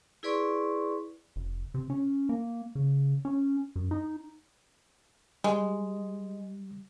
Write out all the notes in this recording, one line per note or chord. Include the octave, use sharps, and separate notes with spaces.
E4 G#4 B4 D5 C6 C#6
F1
C3
C#4
A#3
C#3
C#4
F#2
D#4
G3 G#3